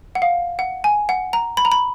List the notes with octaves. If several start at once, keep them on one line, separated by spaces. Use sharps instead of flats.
F#5
F5
F#5
G#5
F#5
A#5
B5
A#5
B5